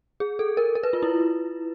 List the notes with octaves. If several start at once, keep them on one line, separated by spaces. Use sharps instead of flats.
G#4
A4
A#4
A#4
B4
F4
E4